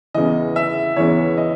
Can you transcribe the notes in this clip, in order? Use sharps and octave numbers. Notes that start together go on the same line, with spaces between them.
E2 C#3 E3 D#5
E5
E2 C#3 E3 C#5
D#5